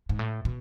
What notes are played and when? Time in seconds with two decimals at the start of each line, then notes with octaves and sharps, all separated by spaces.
0.09 G#2
0.19 A2
0.45 B2